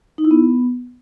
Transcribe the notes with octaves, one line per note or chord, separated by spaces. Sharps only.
D#4
E4
B3